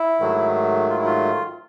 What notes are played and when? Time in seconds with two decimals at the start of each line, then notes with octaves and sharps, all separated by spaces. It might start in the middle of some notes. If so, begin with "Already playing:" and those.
Already playing: E4
0.20 G#2 D#3 F#3 A3
0.90 F4
0.98 E4
1.05 F4